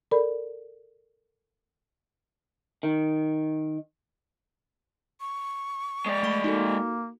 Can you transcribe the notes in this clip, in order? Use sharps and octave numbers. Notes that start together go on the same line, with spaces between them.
A4 A#4 D5 B5
D#3
C#6
G#3 D5
A3 B5 G7
A#3 D#4 F#4 A4